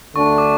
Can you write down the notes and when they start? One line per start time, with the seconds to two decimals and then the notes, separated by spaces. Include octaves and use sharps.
0.16 D2 D3 A3 D4 C#6
0.38 D6